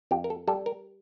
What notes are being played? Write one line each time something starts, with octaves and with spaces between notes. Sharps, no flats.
F2 G4
A#4
A4
G3 A4
A#4